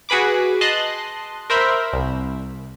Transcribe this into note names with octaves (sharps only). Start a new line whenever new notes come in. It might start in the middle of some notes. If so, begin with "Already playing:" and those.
F#4 G#4 B4 B5 D6
D#5 A5 C6 F#6
A#4 C5 E5 B5
C2